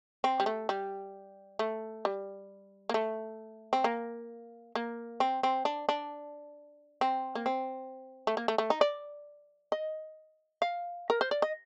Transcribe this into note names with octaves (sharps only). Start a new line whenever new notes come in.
C4
G3
A3
G3
A3
G3
A#3
A3
C4
A#3
A#3
C4
C4
D4
D4
C4
A#3
C4
A3
A#3
A3
A3
D#4
D5
D#5
F5
A#4
C5
D5
D#5